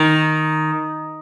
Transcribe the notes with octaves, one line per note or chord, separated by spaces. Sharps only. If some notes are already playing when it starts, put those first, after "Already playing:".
Already playing: D#3